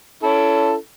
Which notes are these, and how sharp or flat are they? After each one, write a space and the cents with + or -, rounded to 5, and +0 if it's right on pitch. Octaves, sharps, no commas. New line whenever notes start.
C#4 +25 E4 +25 A4 +0